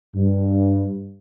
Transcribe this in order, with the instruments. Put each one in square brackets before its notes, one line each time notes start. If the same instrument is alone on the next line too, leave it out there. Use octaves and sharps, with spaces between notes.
[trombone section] G2